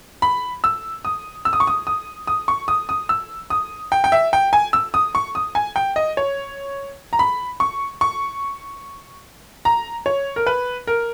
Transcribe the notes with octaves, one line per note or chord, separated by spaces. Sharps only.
B5
E6
D#6
E6
D#6
C#6
D#6
D#6
D#6
C#6
D#6
D#6
E6
D#6
G5
G5
E5
G5
G#5
E6
D#6
C#6
D#6
G#5
G5
D#5
C#5
A#5
B5
C#6
C#6
A#5
C#5
A#4
B4
A#4